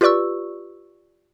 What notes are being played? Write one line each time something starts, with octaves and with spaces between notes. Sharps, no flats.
F4 G4 B4 D5 C#6 E6